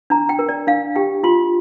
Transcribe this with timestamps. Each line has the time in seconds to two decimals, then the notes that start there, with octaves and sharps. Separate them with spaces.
0.10 D4 A#5
0.29 G5
0.39 A#4
0.49 D5
0.67 D4 F5
0.96 G4 G5
1.23 F4 C6